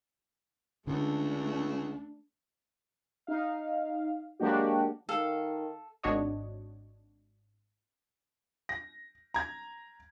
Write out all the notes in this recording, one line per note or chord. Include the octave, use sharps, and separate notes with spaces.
C#2 D3 A3 D4
D#4 F5
F#3 G#3 A#3 D4 F#4 G4
D#3 A4 F5
G#1 D4 F#4 C#5 D#5
A#6
A#5 G#6